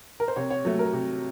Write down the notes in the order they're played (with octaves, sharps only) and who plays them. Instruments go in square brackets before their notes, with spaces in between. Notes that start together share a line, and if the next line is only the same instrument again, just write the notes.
[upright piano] A#4
C5
C3 C#5
C#5
F#3 A3
A#4
C3